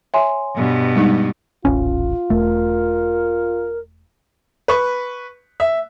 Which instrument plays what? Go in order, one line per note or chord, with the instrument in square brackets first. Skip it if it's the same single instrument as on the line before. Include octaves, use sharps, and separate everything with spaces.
[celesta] C#5 G#5 C6 [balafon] E5
[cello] G2 B2
[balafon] G3 G#3 D#4
[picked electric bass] D#1 A1 C#4 [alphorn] F4
[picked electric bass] E1 A3 [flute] A#4
[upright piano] B4 C#6
E5